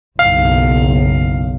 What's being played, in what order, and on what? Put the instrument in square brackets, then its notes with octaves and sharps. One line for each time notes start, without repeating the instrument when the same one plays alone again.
[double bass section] F#1 B1 [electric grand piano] F5